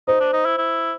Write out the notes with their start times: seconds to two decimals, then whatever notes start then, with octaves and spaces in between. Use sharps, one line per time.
0.08 D#4 C5
0.20 D4
0.33 D#4
0.45 E4
0.58 E4